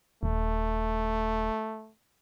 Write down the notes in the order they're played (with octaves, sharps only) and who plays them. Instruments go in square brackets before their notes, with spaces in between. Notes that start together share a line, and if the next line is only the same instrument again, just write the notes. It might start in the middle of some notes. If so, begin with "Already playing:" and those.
[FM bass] D#1 [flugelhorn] A3